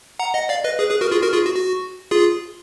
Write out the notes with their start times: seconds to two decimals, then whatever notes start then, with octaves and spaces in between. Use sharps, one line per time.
0.19 F#5 A#5
0.34 D#5 F#5
0.49 D5 F5
0.64 B4 D#5
0.79 G#4 B4
0.90 G#4 B4
1.01 F#4 A#4
1.11 F4 G#4
1.23 F#4 A#4
1.33 F4 G#4
1.45 F#4
1.56 F#4
2.11 F4 G#4